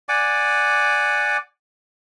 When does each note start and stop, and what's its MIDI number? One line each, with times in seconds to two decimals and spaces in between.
0.09 1.37 74
0.09 1.37 78
0.09 1.37 80
0.09 1.37 86